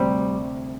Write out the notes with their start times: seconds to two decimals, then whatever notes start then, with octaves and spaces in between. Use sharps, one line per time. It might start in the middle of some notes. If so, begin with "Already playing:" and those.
Already playing: D2 C3 G3 C4